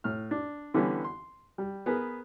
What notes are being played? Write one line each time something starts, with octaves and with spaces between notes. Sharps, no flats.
A2 F6
D4
D3 E3 G3 B3 C#4
C6
G3
B3 G#4 A#4 B4